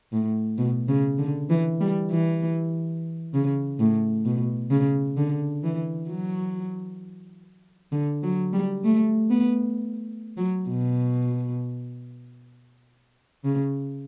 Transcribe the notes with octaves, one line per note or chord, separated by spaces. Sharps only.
A2
B2
C#3
D3
E3
G3
E3
C#3
A2
B2
C#3
D3
E3
F#3
D3
F#3
G3
A3
B3
F#3
B2
C#3